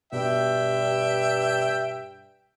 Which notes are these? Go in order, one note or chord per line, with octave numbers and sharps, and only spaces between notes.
G2 B2 E5 G5